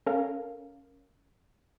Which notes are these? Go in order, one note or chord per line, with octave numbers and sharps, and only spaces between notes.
C#4 A4 A#4 F5